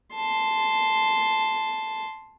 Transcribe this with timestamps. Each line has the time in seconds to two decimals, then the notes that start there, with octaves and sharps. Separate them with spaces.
0.15 A5 C6